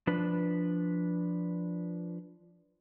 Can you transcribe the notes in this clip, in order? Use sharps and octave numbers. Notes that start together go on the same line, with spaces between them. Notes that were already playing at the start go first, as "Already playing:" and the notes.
F3 D4 B4